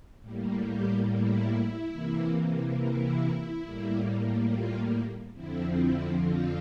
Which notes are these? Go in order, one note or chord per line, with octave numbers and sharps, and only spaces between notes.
A2 G3 A#3
G4
E4
C3 E3 A#3
E4
A2 G3 A#3
F4
F2 D3 F3 C4 E4
E4
F4